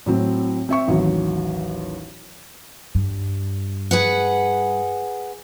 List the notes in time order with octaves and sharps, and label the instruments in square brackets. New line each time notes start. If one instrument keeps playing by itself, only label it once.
[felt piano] A2 F#3 C4
C4 E5 C#6
A1 D#2 F#3
[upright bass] G2
[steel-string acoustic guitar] G#4 B4 F#5